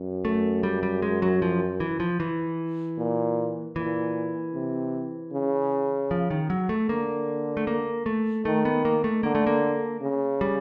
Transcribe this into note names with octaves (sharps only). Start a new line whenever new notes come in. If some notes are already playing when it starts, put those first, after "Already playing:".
Already playing: F#2
A3
G3
G3
G#3
F#3
F3
E3
F3
E3
A#2
A#2 E3
C3
C#3
F3
D#3
F#3
A3
D3 A#3
A3
A#3
A3
D#3 A3
B3
A#3
A3
D3 A#3
A3
A#3
C#3
G3